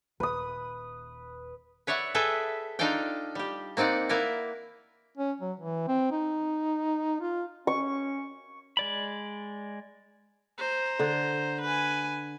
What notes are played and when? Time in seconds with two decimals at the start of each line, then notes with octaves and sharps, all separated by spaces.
0.20 D#1 B4 D#6
1.87 B4 C#5 D5 E5 F#5
2.15 G#4 A4 B4 E5 G5
2.79 D4 D#4 F4 A4 D5 G5
3.35 G3 G4
3.77 A#3 C4 D#4 D5 F#5
4.09 A#3 E4 A#4 B4 D5
5.17 C#4
5.40 F#3
5.60 E3
5.87 C4
6.12 D#4
7.21 F4
7.67 C#4 C#6
8.77 G#3 D5 B5
10.58 C5 A#5
10.99 D3
11.62 B4 G#5